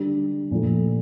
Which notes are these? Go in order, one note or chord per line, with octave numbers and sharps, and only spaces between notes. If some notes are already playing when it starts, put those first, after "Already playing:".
Already playing: D3 G3 D4
A#2 F3 A3